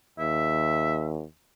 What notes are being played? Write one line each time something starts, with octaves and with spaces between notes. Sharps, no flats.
D#2 E5